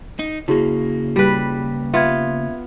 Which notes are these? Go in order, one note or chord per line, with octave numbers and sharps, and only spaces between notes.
D#4
C#3 A#3 E4 F#4 G#4
G3 B4
B3 F4 E5 G#6